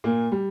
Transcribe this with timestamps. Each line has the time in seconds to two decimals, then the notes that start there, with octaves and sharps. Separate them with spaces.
0.04 A#2 A#3
0.32 G3